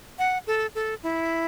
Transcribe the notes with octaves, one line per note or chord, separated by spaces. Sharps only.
F#5
A4
A4
E4